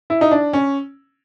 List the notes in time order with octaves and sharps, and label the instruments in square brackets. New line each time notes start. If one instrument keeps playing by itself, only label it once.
[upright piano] E4
D#4
D4
C#4